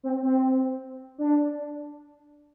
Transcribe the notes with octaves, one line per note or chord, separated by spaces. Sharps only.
C4
C4
D4